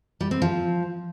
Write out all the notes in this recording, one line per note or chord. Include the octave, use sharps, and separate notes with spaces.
G3
C4
F3